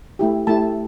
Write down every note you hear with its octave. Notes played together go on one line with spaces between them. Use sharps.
A3 E4 G4
A3 E4 G4 A5